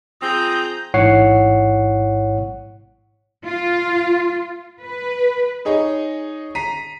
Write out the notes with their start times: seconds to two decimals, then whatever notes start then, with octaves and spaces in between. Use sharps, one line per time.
0.22 F3 C4 G#4 A#5 D#6 G6
0.94 A1 G#2 E4 C#5 F#5 C7
3.46 F4
4.80 B4
5.65 D#4 G#4 C#5 D#5
6.55 A#5 B6 C7 D#7